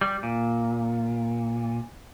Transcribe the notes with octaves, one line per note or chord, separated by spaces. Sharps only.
G3
A#2